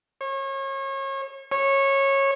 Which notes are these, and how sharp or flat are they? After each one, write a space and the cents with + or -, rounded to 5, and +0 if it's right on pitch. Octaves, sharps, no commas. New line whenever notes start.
C#5 -35
C#5 -20